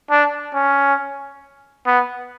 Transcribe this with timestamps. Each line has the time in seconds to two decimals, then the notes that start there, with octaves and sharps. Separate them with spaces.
0.10 D4
0.55 C#4
1.86 B3